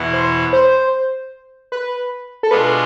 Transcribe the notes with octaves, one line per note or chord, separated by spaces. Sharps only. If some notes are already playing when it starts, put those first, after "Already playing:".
Already playing: E2 B2 B3 E4
C5
C5
B4
A4
B2 G#3 B3 D4 F4 B4